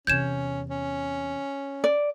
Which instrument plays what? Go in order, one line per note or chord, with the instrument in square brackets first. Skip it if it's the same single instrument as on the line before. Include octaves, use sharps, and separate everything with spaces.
[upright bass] E2 C3 [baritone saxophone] C#4 [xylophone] G6 G#6 E7
[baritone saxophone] C#4
[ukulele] D5